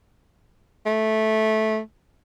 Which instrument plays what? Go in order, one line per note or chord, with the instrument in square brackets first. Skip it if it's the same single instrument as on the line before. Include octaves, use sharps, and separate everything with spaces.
[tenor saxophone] A3